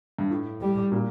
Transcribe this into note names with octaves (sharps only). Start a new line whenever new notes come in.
G2
A2
G3
A#2